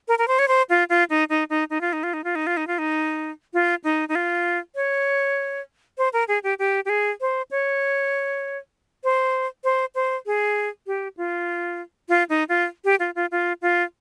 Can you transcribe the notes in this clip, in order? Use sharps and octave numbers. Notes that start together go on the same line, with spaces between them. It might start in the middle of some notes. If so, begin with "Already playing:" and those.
A#4
A#4
C5
C#5
C5
F4
F4
D#4
D#4
D#4
D#4
F4
D#4
F4
D#4
F4
D#4
F4
D#4
F4
D#4
F4
D#4
D#4
F4
C#5
C5
A#4
G#4
G4
G4
G4
G#4
C5
C#5
C5
C5
C5
G#4
G4
F4
F4
D#4
F4
G4
F4
F4
F4
F4